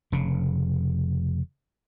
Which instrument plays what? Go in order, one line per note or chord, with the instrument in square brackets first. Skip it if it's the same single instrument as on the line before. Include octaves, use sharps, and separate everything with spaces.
[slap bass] F1 C#3